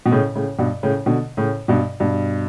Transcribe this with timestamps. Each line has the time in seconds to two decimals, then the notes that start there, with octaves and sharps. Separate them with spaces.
0.06 B2
0.12 A2 C#3
0.36 A2 C#3
0.59 G2 B2
0.83 A2 C#3
1.06 B2 D3
1.37 A2 C#3
1.68 G2 B2
2.00 G2 B2